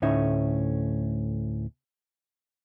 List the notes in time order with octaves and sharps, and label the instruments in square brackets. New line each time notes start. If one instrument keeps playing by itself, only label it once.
[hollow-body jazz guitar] D2 A2 A3 C#4 D#4 E5